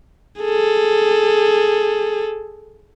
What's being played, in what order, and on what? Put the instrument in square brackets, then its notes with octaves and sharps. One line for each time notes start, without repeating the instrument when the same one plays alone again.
[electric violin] G#4 A4